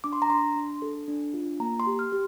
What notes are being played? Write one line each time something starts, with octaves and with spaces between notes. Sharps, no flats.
D4 D6
C6
A#5
D4 C6
D4
A4
D4
F4
A#3 A#5
C6
G4
F6
G4